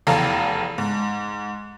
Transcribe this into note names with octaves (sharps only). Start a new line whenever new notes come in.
F1 E2 A4 F5 A#5
G#2